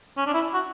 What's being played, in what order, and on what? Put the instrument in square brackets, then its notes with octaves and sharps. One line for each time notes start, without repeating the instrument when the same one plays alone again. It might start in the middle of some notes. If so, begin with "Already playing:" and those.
[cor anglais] C#4
D4
E4
F#4